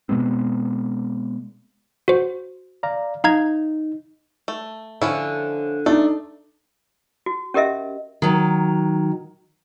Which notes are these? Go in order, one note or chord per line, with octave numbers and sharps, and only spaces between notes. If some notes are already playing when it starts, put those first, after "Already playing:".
B2 G#3 B3 C4
F#4 C5
D5 F5 A#5
D#4 F5 A#5 G#6
A3
D3 F3 C#4 E4
A3 D4 D#4
F#4
C#4 G4 A#4 D#5 E5
D#3 F#3